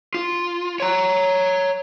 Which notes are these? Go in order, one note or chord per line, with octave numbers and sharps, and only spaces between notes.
F4
C#5 A#5